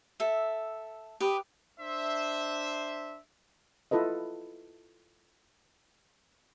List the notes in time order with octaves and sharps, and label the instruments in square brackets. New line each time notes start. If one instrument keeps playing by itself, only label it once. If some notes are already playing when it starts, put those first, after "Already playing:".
[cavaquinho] A4 E5
G4 B4 D#6
[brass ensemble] D4 C5 E5
[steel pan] E4 F4 A4 B4 D#5